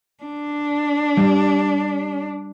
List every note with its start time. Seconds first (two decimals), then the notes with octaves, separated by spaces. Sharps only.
0.23 D4
1.17 G3